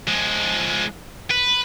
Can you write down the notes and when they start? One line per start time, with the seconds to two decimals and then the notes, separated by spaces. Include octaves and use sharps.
0.08 F3 G#3
1.31 B4